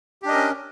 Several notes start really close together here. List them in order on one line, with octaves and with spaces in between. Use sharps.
G4 D4 D#5 A#4 C#4